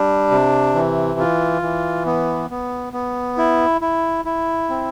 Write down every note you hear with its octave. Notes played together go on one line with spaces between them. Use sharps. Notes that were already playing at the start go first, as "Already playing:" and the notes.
Already playing: G3 D4
C3
E3
F4
E3
B3
B3
B3
E4
E4
E4
C4